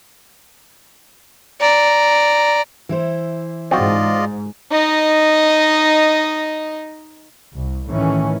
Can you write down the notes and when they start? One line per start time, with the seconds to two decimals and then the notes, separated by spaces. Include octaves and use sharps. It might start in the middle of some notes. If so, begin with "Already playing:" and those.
1.60 D5 A#5
2.89 E3 E4 C5
3.71 G#2 C4 F4 F#4 D5 D#5
4.72 D#4 D#5
7.53 C2
7.88 A2 D#3 E3 C#4